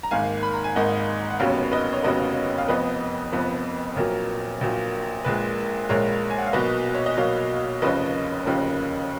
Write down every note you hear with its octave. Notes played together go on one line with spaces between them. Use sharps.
A#5
G#1 G#2 D#3 A#3 F5 G#5
B5
A#5
G#5
G#1 G#2 D#3 A#3 D#5 F#5
F#5
F1 D#2 C#3 F#3 B3 C#5 F5
B4 D#5
C#5
F1 D#2 C#3 F#3 B3 B4 D#5
F5
F1 F2 F3 B3 B4 D#5
F1 F2 F3 B3
A#1 A#2 F#3 A#4 C#5
A#1 A#2 F#3
A#1 A#2 G#3 B4
A#1 A#2 G#3 A#4 C#5
G#5
F#5
F5
B1 B2 A#3 B4 D#5
C#5
D#5
B1 B2 A#3 C#5 F5
F1 D#2 C#3 F3 B4 D#5
F1 D#2 C#3 F3